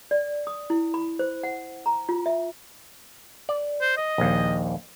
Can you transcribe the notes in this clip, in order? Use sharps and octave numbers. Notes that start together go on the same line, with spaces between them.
D5
D#6
E4
B5
C5
F#5
A#5
F4
E5
D5
C5
D#5
A#1 D#2